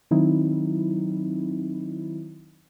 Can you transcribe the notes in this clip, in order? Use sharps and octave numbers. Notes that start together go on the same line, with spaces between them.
D#3 F#3 C4 D#4 E4